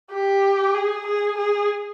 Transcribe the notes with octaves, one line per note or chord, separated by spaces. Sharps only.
G4
G#4
G#4
G#4